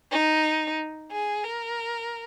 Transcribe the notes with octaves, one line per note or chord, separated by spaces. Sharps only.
D#4
G#4
A#4